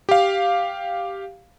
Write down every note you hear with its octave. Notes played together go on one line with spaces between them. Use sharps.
G4 F5